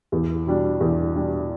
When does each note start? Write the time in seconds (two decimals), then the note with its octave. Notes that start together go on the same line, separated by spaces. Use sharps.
0.12 E2
0.47 B2 G3 D4
0.81 E2
1.16 B2 G3 D4